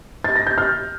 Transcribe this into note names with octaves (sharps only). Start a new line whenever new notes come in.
A6
A#6
G6
F6